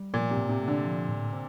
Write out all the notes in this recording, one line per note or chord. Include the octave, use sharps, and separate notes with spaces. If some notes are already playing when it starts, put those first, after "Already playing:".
Already playing: G3
A#2 F3
C3
A2
C3
A3
D3
F3
A2
C4